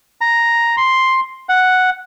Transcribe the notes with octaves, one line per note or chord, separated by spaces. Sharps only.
A#5
C6
F#5